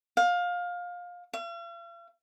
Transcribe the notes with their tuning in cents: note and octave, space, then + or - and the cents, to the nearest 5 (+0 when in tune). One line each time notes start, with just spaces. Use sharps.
F5 +20
F5 -45